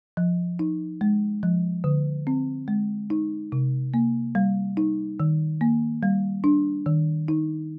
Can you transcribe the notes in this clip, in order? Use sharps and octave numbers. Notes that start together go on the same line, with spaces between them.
F3
D#4
G#3
F3
D3
C4
G#3
D#4
C3
A#3
G3
D#4
D#3
A#3
G3
D4
D#3
D#4